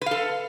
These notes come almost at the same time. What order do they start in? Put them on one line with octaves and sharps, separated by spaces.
B4 F5 A4